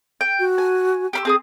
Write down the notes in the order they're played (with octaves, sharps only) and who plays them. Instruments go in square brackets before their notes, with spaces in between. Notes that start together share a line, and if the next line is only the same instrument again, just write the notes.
[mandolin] G5
[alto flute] F#4
[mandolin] G#5
G4 B5 E6
C4 G#4 D#6